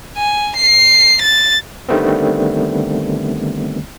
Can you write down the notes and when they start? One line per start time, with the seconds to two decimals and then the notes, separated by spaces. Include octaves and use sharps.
0.17 G#5
0.57 C7
1.22 A6
1.89 D3 D#3 G3 A3 B3 C4